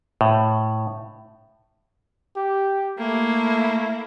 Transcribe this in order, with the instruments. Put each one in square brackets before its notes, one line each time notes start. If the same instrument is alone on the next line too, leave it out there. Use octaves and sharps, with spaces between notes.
[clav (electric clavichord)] A2
[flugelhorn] G4
[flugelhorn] A3 [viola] A#3 E4